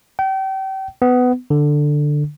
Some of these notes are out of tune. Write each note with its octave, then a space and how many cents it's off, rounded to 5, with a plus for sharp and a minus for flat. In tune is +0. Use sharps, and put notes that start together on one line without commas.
G5 -35
B3 +20
D3 +10